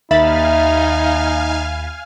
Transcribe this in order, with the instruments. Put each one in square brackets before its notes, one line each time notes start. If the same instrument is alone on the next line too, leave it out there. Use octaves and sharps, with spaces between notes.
[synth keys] D#2 B5 A6 [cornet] D#4 [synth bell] E5 [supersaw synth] F5 G#5 F6